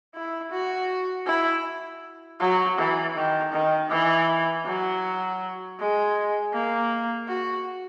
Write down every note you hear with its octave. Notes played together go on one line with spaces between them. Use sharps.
E4
F#4
E4
F#3
E3
D#3
D#3
E3
F#3
G#3
A#3
F#4